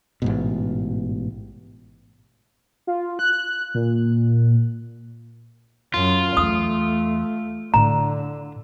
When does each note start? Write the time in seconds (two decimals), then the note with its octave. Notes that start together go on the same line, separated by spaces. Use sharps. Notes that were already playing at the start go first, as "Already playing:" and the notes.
0.22 A1 G#2 B2
2.87 F4
3.19 F#6
3.74 A#2
5.94 F#2 F4
6.37 E2 A3 D#6
7.74 A2 D3 D4 A#5